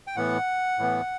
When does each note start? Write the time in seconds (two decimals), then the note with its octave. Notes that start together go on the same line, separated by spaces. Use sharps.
0.07 G5
0.16 A2 E3 B3 F#5
0.79 A2 E3 B3